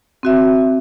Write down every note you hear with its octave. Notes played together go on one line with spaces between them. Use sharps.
C4 F#4 E5